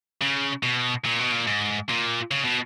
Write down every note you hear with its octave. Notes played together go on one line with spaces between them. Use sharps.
C#3
B2
A#2
B2
A#2
G#2
A#2
C#3
B2